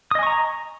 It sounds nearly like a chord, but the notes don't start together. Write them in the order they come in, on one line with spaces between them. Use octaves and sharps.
D#6 D#5 G#5 C#6 A#5